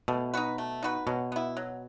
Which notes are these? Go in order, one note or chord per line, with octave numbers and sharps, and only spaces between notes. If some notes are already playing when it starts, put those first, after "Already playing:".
B2 A3
D#4 F#4 B4
A3
D#4 F#4 B4
B2 F#3
B3 E4
F#3